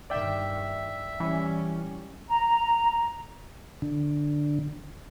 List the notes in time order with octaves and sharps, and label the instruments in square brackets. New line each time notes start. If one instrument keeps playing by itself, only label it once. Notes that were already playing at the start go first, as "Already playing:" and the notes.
[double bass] G2 D#3 [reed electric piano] D5 G5 [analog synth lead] E5
[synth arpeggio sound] E3 [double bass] G3 C#4
[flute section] A#5
[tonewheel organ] D3